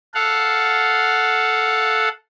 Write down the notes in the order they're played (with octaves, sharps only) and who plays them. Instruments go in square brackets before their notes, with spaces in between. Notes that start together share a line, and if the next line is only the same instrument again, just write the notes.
[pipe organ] A4 F5 F#5